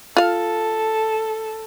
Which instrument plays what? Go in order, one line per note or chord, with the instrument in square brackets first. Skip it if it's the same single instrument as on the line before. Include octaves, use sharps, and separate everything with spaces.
[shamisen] F4 F5 [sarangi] A4